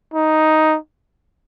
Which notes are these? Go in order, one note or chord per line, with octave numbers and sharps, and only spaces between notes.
D#4